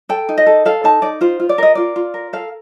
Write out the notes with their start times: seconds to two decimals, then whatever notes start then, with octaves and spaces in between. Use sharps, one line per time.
0.09 A4 G5
0.29 D#4
0.38 D#5
0.46 A4
0.65 A4 F5
0.84 D#4 A5
1.02 D#4 D5
1.21 F4 C5
1.40 F4
1.49 D5
1.58 A#4 D#5
1.75 F4 D5
1.96 F4
2.14 A#4
2.33 A4 F5